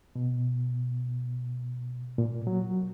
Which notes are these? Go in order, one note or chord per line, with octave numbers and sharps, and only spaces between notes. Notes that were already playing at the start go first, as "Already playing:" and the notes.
B2
A#2
F#3